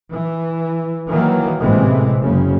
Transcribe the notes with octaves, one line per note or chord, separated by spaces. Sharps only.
E3
D#3 E3 F#3 A#3
A1 G#2 C3 E3 G#3
F#1 C#3